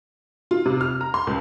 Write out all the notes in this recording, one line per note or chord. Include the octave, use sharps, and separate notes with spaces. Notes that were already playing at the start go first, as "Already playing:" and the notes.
F4
C3
F6
A#5
C6
C#2